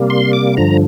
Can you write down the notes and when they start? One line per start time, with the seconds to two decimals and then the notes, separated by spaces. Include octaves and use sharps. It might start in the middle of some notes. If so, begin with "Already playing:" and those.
Already playing: C3 G3 A#3
0.10 C6
0.33 D6
0.57 G2 D3 F3 A#5